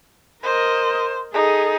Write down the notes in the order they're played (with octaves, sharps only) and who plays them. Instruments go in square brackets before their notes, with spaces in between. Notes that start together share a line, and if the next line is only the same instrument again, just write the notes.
[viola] A#4 D#5 [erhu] C5
[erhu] D#4 [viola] G#4 A4